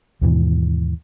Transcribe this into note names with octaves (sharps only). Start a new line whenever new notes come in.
D#2 G#2 B2 E3